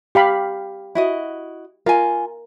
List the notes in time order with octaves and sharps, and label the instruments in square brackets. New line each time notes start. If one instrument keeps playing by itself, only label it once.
[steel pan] G4 F5 B5
[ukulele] E4 F#4 D#5
[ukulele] F4 G#5 [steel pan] A#4